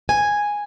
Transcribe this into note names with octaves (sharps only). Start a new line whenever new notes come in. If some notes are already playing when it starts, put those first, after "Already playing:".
G#5